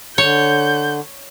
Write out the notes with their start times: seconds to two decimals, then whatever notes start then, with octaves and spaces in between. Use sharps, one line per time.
0.18 D3 C#5 G6